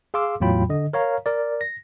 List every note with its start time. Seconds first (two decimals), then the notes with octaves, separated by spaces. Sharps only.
0.14 G#4 F5 C6 D6 E6
0.40 E2 A2 F#3 F4 G5 B5
0.69 D3 D#5
0.93 A#4 C#5 F5 A#5
1.26 A#4 D5
1.61 A#6